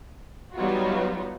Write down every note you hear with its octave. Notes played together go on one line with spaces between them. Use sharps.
F#3 G3 B3 D#4 F4 F#4